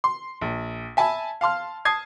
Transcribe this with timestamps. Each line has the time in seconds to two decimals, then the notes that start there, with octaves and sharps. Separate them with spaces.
0.04 C6
0.41 A#1
0.97 E5 G#5 A5 B5
1.41 F5 A5 C6 F6
1.85 A5 D#6 G#6 C7